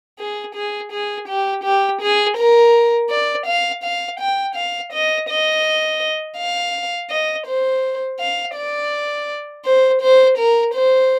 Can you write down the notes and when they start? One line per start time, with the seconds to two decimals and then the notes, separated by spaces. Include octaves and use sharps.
0.19 G#4
0.55 G#4
0.92 G#4
1.28 G4
1.64 G4
2.01 G#4
2.37 A#4
3.10 D5
3.46 F5
3.83 F5
4.20 G5
4.55 F5
4.93 D#5
5.29 D#5
6.37 F5
7.10 D#5
7.47 C5
8.20 F5
8.55 D5
9.65 C5
10.02 C5
10.38 A#4
10.74 C5